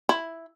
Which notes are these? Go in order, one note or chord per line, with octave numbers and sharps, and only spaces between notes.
E4